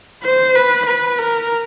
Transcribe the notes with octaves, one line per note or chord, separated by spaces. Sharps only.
C5
B4
B4
A#4